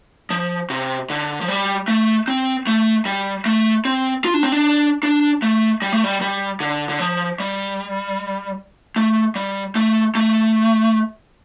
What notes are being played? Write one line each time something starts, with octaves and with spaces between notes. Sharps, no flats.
F3
C3
D3
F3
G3
A3
C4
A3
G3
A3
C4
F4
D4
C4
D4
D4
A3
G3
A3
G3
G3
D3
D3
F3
G3
A3
G3
A3
A3